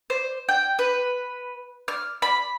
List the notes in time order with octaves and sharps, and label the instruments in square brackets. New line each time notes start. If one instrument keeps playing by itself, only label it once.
[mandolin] C5
G5
B4
F6
B5